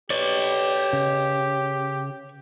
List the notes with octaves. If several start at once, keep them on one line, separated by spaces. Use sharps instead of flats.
G4 B4 C#5 D5
C#3